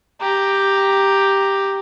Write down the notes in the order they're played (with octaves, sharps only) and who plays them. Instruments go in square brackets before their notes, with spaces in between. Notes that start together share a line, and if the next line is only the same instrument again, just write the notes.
[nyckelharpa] G4 A#5